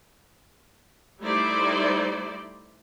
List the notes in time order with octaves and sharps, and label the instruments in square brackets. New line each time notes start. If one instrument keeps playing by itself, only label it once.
[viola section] G3 A3 D#4 E4 C5 D5